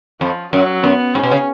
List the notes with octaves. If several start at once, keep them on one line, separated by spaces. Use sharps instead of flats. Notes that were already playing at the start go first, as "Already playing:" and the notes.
F2 F3
F#2 F#3
F#2 B3
G#2 C#4
B2
C#3